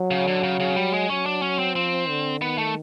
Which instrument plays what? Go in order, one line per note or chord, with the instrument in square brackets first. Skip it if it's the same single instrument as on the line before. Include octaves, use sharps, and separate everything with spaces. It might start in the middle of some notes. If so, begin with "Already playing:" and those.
Already playing: [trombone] F#3
[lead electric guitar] C#3
D3
C#3
C#3
G3
G#3
[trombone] F#3 [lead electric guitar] C#4
[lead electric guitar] D4
C#4
C4
[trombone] F3 [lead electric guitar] C4
[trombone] D3
[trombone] D#3 [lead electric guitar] B3
[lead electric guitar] A3